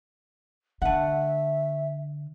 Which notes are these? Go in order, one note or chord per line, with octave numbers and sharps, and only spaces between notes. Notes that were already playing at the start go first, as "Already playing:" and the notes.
D3 A3 E5 F#5